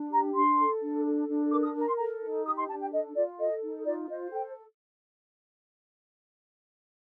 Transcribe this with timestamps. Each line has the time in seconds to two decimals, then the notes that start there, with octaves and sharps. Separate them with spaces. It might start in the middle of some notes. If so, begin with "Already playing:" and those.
Already playing: D4
0.11 G4 A#5
0.34 D4 C6
0.58 A4
0.82 D4
1.05 A4
1.28 D4
1.52 A#4 D6
1.63 D#6
1.75 A#4 A#5
1.87 C6
1.98 A4 A#5
2.22 D#4
2.46 G4 D#6
2.57 C6
2.69 D4 A5
2.81 G5
2.93 A4 D#5
3.16 F4 D5
3.39 A4 D#5
3.63 D#4
3.86 F4 D5
4.09 C5 D#5
4.32 A4 G5